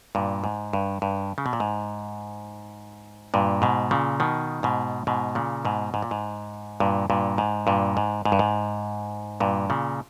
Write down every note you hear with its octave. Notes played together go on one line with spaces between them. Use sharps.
G2 A#2
G#2
G2
G2
C#3
B2
A#2
G#2
G2 A#2
G#2 B2
A#2 C#3
B2 D#3
G#2 B2
G#2 B2
A#2 C#3
G#2 B2
G#2
A#2
G#2
G2 A#2
G2 A#2
G#2
G2 A#2
G#2
G#2
G2
G#2
G2 A#2
A#2 C#3